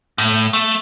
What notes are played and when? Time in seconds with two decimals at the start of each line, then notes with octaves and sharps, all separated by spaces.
0.18 A2
0.53 A3